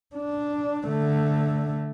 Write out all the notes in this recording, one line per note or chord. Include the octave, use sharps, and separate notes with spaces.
D4
D3 A3